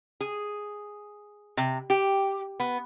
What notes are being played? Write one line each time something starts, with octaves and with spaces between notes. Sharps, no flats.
G#4
C3
G4
B3